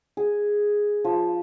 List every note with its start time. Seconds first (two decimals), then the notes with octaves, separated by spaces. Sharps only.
0.17 G#4
1.04 F3